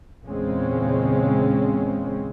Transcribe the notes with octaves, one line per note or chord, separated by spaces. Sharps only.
E2 A#2 C#3 G#3 C4 C#4